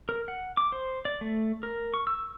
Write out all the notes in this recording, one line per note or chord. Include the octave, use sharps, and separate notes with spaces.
A#4
F#5
D6
C5
D5
A3
A#4
C#6
E6